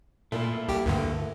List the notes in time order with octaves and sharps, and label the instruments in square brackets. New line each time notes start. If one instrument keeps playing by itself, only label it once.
[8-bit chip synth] A#2 [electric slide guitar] A3 A#3 E4
[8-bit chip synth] C2 G4 G5
D2 G2 D3